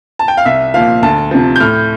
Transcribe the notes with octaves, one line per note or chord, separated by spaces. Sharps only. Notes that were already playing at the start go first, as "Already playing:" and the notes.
A5
G5
F5
C2 E5
A#2 F3 F5
D2 A5
C3 F3
G6
A2 F6